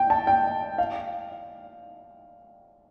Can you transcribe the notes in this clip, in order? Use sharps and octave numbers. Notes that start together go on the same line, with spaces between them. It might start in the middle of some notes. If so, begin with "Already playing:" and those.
Already playing: G5
A5
G5
F5